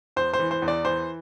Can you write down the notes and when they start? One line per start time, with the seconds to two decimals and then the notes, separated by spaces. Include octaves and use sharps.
0.16 E2 C5
0.34 C5
0.39 E3
0.51 C5
0.62 E2
0.68 D5
0.85 E3 C5